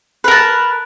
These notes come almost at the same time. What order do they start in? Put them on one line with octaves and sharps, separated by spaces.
B4 A#4 A5